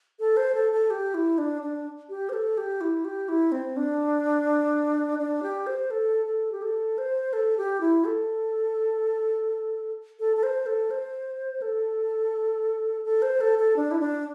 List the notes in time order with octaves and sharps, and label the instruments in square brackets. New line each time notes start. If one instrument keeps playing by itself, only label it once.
[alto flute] A4
C5
A4
A4
G4
E4
D4
D4
G4
C5
A4
G4
E4
G4
E4
C4
D4
D4
G4
C5
A4
A4
G4
A4
C5
A4
G4
E4
A4
A4
A4
C5
A4
C5
A4
A4
C5
A4
A4
D4
E4
D4